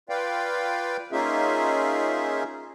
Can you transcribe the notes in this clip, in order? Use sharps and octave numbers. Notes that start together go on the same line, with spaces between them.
F4 B4 D5 F5 G5
A#3 C#4 D#4 F4 G#4 E5